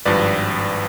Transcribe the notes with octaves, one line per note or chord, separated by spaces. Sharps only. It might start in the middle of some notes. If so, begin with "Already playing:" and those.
G#1 G2 F3 B4 D5